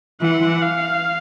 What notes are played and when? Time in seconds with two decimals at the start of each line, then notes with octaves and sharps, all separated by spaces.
0.21 E3 F#5
0.62 F5